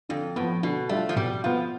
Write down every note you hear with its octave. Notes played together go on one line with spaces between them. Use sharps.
F2 D3
A2 F3 B3
B2 D3
G3 A3 D4 F4
F3
B2 G3
F3 B3 F4